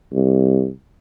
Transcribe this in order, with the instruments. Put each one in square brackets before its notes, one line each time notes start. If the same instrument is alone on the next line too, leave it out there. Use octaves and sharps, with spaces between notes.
[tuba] C2